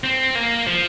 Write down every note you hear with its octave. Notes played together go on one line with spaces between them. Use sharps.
C4
A#3
F3